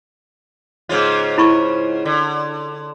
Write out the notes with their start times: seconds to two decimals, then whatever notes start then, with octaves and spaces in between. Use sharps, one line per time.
0.89 G#2 C#3 F4
1.38 E4 B5 C#6
2.05 D3